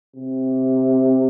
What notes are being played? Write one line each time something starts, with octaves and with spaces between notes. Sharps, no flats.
C3